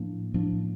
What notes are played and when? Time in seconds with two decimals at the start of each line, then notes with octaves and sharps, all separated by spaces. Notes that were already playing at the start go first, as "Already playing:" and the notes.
Already playing: A2 F3 A#3 D4
0.34 A2 F3 A#3 D4